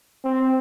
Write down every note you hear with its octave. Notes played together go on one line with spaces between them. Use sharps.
C4